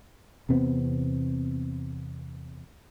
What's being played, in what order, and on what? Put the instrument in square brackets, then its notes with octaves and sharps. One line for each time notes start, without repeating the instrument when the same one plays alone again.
[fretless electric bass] E2 C3 B3 C4